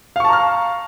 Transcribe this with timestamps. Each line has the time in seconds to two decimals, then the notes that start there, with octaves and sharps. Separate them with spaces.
0.16 F5
0.20 C#6
0.24 A5
0.29 A#5
0.33 F6